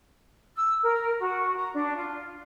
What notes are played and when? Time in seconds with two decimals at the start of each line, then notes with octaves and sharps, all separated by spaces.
0.56 E6
0.81 A#4
1.19 F#4
1.56 A#5
1.74 D4
1.96 F4